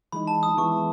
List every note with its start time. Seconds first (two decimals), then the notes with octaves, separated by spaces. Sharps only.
0.12 E3 G#3 D#4 B5
0.27 A5
0.43 D#6
0.58 E3 G#3 B3 E4 C#6